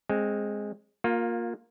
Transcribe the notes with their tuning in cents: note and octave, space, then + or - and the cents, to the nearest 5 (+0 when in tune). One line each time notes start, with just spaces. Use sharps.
G#3 +0 C4 +15
A#3 +0 F4 +25